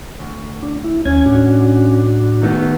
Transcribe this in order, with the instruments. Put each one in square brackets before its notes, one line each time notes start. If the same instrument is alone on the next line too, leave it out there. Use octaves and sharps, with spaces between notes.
[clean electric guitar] D2
[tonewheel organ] D4
E4
[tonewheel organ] D#2 G#5 G#6 [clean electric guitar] C#4
[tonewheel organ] A2 D4 F#4
[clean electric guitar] D#3 A3 B3